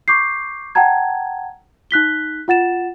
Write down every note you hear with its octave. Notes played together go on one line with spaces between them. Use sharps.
C#6 D6 G6 C7
F#5 G5 A5 A#5 G#6
D#4 F#6 B6 G7
F4 F#5 A6 E7